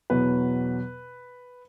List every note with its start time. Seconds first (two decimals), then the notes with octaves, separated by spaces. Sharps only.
0.10 E2 B2 F#3 B4